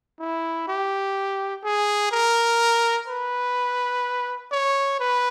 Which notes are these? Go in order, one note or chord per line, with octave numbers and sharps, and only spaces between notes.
E4
G4
G#4
A#4
B4
C#5
B4